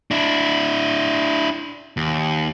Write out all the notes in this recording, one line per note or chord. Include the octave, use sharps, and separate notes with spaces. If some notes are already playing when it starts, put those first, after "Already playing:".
D4 E4
D#2